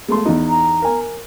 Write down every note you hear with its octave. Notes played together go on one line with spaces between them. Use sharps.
G#3 A3 C6
E2 D#4
A#5
A#4 G#5